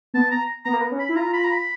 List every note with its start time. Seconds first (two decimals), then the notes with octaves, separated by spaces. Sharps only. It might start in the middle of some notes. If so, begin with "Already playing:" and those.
0.14 B3 A5
0.31 A#5
0.65 B3 A#5
0.73 A#3
0.81 B3
0.92 C#4
1.00 B5
1.09 E4
1.16 F4 A#5
1.33 B5
1.44 A#5
1.51 B5